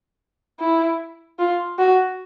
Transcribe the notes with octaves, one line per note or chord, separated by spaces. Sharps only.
E4
F4
F#4